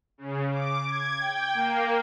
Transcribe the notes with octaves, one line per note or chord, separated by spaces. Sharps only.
C#3
D6
G#6
G5
A#3